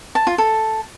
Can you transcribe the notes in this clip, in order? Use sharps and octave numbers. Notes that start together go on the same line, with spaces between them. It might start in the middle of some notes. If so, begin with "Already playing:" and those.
A5
F4
A4